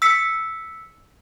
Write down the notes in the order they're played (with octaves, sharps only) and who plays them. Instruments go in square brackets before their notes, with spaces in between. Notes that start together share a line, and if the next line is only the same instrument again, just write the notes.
[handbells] E6 B6 C#7